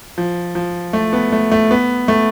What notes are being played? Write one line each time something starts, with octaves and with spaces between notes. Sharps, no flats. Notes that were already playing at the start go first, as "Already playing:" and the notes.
F3
F3
A3
B3
A3
A3
B3
A3